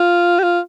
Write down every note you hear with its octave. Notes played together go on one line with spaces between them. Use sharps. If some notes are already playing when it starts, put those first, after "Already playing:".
Already playing: F4
G4
F4